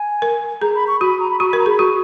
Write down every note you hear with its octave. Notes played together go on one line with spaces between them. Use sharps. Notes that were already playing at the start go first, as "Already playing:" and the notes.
Already playing: G#5
A#4
G#4 A#5
B5
C#6
F#4 B5
A#5
B5
F#4 C#6
B5
A#4
A#5
G#4 B5
F#4 C#6